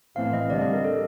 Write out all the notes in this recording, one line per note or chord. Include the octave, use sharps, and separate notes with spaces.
A2 E3 A3 C4 F5
D#5
D3 G3 C4 D5
D#5
A#4
A4